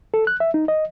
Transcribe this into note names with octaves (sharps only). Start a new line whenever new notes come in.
A4
F#6
E5
D#4
D#5